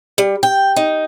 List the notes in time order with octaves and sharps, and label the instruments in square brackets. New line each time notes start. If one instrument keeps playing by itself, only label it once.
[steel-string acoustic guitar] G3
G5
D#4